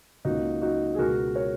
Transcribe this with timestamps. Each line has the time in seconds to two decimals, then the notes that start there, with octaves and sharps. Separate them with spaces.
0.25 C#2 C#3 F#3 A#3 D#4 F#4
0.62 D#4 F#4
0.95 G#4
0.99 C#2 B2 G#3 F#4 A#4
1.35 A#4 C#5